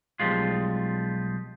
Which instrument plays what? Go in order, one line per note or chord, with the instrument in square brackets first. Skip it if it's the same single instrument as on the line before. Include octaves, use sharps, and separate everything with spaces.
[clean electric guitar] B1 F3 G3 G#3 F4